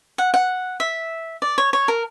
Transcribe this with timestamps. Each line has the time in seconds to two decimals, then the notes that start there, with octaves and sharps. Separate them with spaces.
0.18 F#5
0.34 F#5
0.80 E5
1.42 D5
1.58 C#5
1.73 C#5
1.88 A#4